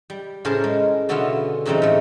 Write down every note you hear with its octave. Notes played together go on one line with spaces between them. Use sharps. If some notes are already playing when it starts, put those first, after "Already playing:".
G3
A2 C#3 G#4 A#4 C5 A5
G#3
B2 D3 B3 C#4 E4 F4
A#2 C#3 E3 G3 C4 D#4
A2 A3